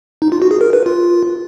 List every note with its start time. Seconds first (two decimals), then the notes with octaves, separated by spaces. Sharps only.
0.22 D#4
0.32 F4
0.42 F#4
0.51 G#4
0.61 A#4
0.73 B4
0.86 F4